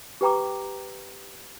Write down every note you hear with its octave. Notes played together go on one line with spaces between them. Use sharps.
G4 B4 G5 A#5 D6